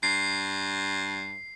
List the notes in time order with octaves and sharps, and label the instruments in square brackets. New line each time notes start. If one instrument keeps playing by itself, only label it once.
[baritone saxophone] G2 [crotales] C7